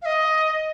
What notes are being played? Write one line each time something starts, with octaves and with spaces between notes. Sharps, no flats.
F5
D#5